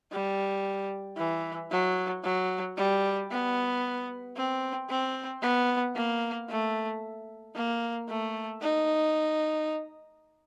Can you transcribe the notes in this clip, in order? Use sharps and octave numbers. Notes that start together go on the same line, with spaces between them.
G3
E3
F#3
F#3
G3
B3
C4
C4
B3
A#3
A3
A#3
A3
D#4